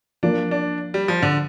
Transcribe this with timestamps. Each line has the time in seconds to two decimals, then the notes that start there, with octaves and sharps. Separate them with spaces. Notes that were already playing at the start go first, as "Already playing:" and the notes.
0.23 F3 A#3 D4 F4 A#4
0.51 D4
0.94 G3
1.08 F3
1.22 D3